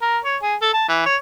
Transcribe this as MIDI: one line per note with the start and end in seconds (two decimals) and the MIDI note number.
0.02 0.18 70
0.25 0.36 73
0.42 0.55 68
0.62 0.70 69
0.74 0.85 81
0.89 1.01 52
1.06 1.16 73